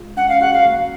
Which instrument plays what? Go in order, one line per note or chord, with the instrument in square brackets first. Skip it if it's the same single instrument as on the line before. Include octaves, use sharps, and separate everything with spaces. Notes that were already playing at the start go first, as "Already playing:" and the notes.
Already playing: [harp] G#3 F4
[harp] C#4 [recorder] F#5
[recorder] F5
[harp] F#4 [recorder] F#5
[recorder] F5
[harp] A#3